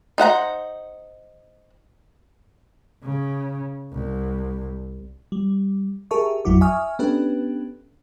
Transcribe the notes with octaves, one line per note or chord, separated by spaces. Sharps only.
D#4 C5 F#5 A#5
C#3
C2
G3
G4 G#4 A#4 E5 A5 C#6
G#1 F2 F#3 E4 F#4 D6
E5 G#5 C#6 D#6 F6
B3 C#4 D4 G4 A4 B4